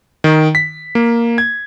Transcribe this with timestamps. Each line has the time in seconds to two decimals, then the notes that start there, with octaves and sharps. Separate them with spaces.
0.24 D#3
0.55 B6
0.95 A#3
1.38 G#6